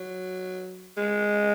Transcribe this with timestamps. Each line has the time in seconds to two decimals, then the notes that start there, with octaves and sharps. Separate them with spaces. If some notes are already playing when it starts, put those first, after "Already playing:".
Already playing: F#3
0.97 G#3